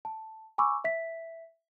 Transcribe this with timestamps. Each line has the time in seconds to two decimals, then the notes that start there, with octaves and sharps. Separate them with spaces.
0.05 A5
0.58 G#5 B5 C#6 D6 E6
0.84 E5 B6